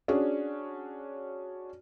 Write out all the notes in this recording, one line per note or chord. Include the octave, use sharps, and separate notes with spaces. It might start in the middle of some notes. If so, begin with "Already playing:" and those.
C#4 D4 F#4 G#4